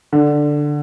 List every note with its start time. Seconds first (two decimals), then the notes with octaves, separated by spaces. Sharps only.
0.13 D3